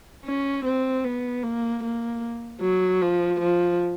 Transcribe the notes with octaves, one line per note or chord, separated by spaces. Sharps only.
C#4
C4
B3
A#3
A#3
F#3
F3
F3